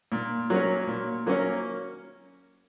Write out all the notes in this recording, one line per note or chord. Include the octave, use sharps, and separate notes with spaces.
A#2
F#3 A#3 C#4
A#2
F#3 A#3 C#4